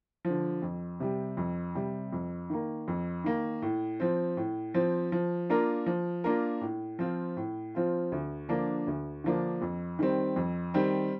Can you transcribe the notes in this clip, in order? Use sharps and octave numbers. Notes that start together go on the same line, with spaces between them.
F3
D3
F2
C3 G3
F2
C3 G3
F2
D#3 A#3
F2
D#3 A#3
A2
F3 C4
A2
F3 C4
F3
A#3 D4 F4 A#4
F3
A#3 D4 F4 A#4
A2
F3 C4 F4
A2
F3 C4 F4
D2
D3 F3 A#3 D4
D2
D3 F3 A#3 D4
F2
D#3 G3 C4
F2
D#3 G3 C4